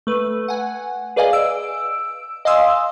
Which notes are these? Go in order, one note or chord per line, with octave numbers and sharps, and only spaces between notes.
A3 B4
F#5 G#5
G#4 B4 D5 D#5 F5 G#5
E6 D7
D#5 F5 G#5 C6 D#6 E6